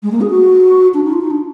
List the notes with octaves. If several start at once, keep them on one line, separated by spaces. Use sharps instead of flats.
G#3
A#3
G#4
F#4
D4
D#4
F4
D#4
D4